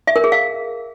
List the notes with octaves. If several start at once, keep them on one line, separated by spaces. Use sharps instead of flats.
E5
A#4
G#4
F5